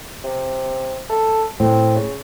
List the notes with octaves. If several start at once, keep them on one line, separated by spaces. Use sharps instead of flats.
C3
A4
A2 C4
C#3